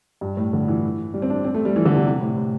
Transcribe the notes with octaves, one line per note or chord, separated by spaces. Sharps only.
G2
A2
D3
E3
G3
C4
D4
C4
A3
G3
E3
D3
C3
C3
A2
A2